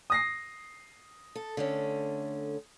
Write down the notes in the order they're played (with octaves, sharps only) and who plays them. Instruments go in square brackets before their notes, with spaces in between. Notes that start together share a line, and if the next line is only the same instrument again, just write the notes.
[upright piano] D#6 A#6 C7
[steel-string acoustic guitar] A4
D3 A3 C#4